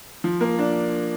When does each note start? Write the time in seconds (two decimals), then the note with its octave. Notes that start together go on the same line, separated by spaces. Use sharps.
0.24 F3
0.41 A#3
0.59 D4